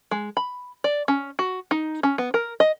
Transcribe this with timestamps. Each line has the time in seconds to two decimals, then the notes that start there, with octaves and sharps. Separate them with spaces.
0.11 G#3
0.37 B5
0.84 D5
1.08 C#4
1.39 F#4
1.71 D#4
2.03 C#4
2.18 B3
2.34 A#4
2.60 D#5